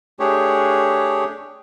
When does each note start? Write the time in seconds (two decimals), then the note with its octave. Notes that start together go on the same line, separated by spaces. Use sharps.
0.20 A3 D4 G4 G#4 C#5